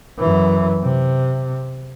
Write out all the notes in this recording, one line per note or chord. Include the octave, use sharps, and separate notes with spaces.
F#2 E3
C3